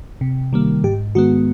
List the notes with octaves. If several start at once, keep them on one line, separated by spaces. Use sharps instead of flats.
C3
D#3 G3 A#3
G#2 G4
D#3 G#3 B3 F#4